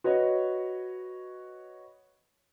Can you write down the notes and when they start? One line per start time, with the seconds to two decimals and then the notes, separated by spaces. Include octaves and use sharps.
0.04 F#4 B4 C#5 D#5